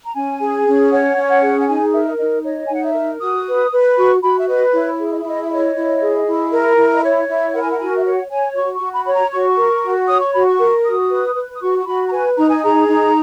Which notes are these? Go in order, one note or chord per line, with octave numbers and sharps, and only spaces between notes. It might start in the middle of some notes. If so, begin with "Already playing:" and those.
A#5
C#4 G#5
G#4
C#4
C#5 F#5
C#4
F#5
G#4
F#5
D#4 G#5
A#4 E5
D#4 D#5
C#5 D#5
G#5
D#4 F#5
E5
A#4
F#4 D#6
B4
B4
F#4 C#6
F#4 B5
E5
B4 D#5
E4 C#5
G#4
D#5
E5
E4 D#5
E5
C#5 D#5
E4
G#4
E4
A#4
E4
D#5
C#5 E5
E4 E5
A#4 F#5
G#5
F#5
F#4 G#5
E5
C#5 F#5
C#5 G#5
F#4 C#6
C#6
F#4
B5
C#5 B5
A#5
F#4 C#6
A#4
F#4
C#5 D#6
C#6
F#4 B5
C#6
A#4
F#4 D#6
B4
B4
D#6
F#4 C#6
C#6
F#4 B5
A#5
B4 G#5
D#4 A#5
G#5
G#4 A#5
D#4